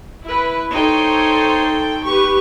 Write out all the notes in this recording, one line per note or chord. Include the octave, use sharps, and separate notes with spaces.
E4 B4
D#4 A4 C5 C#5 G5
G4 B4 C#6